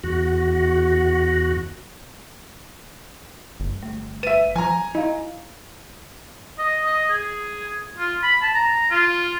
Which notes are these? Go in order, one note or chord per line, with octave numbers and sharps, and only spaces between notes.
E2 F#4
G1
A3
B4 E5 D#7
F3 G#5 A#5
E4 D#5 F5
D#5
D#5
G#4
F4
B5
A5
A#5
F4